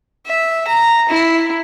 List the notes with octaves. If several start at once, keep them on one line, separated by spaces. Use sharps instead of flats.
E5
A#5
E4